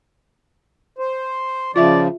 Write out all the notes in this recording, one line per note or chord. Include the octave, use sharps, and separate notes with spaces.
C5
C#3 F3 F4 D5 E5